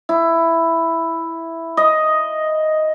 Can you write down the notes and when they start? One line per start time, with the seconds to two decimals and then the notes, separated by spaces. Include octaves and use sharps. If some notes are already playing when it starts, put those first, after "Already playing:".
0.09 E4
1.77 D#5